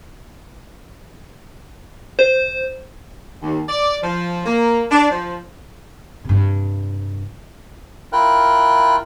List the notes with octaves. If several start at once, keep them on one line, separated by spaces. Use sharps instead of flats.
C5
D#2
D5
F3
A#3
D4
F3
G2 C3
E4 F4 A#4 G5 F#6